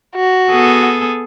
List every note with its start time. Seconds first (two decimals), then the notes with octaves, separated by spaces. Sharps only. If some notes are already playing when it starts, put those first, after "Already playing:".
0.16 F#4
0.49 B3 G#4 A4